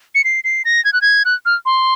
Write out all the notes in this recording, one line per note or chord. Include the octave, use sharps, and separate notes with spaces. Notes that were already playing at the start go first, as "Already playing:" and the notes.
C#7
C7
C7
A#6
G#6
F#6
G#6
F#6
F6
C6